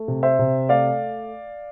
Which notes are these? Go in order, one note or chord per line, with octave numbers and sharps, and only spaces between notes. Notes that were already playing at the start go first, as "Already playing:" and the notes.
Already playing: A3
C3
C5 E5
C3
A3 D5 F5